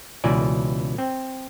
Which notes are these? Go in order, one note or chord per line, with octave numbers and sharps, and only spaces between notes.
C#2 B2 E3 D5 G#5
C4